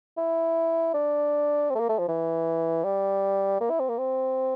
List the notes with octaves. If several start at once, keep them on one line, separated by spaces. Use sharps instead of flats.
E4
D4
C4
A3
A#3
A3
F3
E3
G3
A#3
E4
C4
A#3
C4